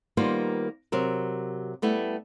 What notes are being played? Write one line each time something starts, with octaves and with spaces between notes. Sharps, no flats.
D#3 G3 A#3 B3 F4 C5
C3 F#3 A#4
G3 A3 B3 E4